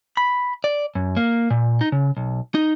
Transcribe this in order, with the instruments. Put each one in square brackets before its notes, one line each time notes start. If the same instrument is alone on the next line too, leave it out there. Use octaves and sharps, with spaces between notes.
[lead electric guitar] B5
D5
F#2
A#3
A#2
D#4
C#3
B1
D#4